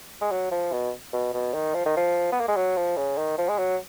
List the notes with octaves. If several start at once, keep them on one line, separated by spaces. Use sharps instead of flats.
G#3
F#3
F3
B2
B2
B2
D#3
F3
D#3
F3
B3
A#3
G#3
F#3
F3
C#3
D#3
F3
G#3
F#3